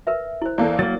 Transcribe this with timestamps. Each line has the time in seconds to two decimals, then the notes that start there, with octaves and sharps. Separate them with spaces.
0.07 A#4 B4 E5
0.42 E4 C5
0.58 E2 A#3 E4 A4 D5
0.79 F#3 A#3 A6